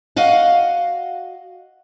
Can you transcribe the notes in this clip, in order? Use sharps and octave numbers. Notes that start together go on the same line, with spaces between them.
F#4 D#5 F5 F#5